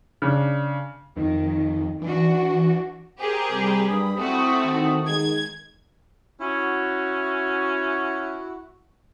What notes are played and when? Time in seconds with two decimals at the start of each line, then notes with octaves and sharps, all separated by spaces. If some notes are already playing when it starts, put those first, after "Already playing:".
0.22 C#3 D4
1.17 F2 D#3
2.02 E3 D4 F#4
3.19 G4 G#4 A#4 C5
3.50 C3 G3 B5
3.89 G2 D#6
4.18 A3 C4 E4 F#4
4.63 D#3
5.08 G#3 G#6
6.41 C#4 E4 F#4